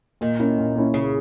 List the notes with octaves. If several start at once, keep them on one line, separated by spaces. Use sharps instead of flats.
A#2 D#3
A#3 C#4 E4
A#2
A#3 C#4 E4
A#2 C#3